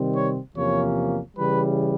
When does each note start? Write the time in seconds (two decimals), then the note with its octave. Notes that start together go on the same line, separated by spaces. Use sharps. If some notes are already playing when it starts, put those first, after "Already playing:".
Already playing: C3 D#3 G3 C4
0.14 C#5
0.54 E2 C3 F3 A#3 C#4 C#5
1.36 C#3 E3 G3 B4